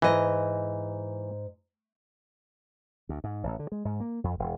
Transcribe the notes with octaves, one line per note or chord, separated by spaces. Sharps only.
G#2 E3 D#5
D2
G#2
A1
D3
G#3
G#2
A#3
F2
E1